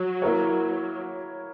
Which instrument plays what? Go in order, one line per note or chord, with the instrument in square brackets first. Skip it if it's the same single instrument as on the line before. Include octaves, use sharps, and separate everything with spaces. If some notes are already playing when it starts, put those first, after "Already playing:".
Already playing: [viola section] F#3
[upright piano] A#3 E4 A#4 C#5